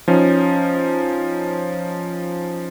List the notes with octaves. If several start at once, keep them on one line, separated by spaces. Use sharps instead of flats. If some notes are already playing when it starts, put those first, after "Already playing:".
F3 C#4 D#4